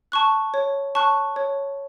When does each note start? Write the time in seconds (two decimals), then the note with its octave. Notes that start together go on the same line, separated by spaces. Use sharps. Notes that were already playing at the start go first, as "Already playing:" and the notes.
0.12 A5 C#6 F#6
0.54 C#5
0.95 A5 C#6 F#6
1.36 C#5